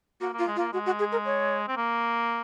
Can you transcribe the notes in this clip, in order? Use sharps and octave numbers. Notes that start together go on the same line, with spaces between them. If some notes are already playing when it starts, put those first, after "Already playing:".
A#3 F#4
A#3
F4
G#3
F4
A#3
G#3 F#4
F#4
G#4
A#4
C#5
C4
A#3